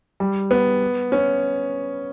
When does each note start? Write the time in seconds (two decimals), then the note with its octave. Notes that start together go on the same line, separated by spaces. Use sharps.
0.20 G3
0.51 B3
1.12 C#4